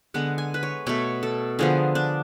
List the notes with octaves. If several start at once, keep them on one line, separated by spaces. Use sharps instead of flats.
D3 G#3 B3 F#5
G#5
B4
C#5
B2 A3 C#5
A4
D3 F3 B3 G#4
D4